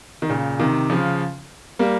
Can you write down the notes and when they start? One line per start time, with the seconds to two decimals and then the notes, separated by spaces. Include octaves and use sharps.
0.22 D#3
0.29 A#2 C#3
0.60 C3 D#3
0.90 C#3 F3
1.79 G3 A#3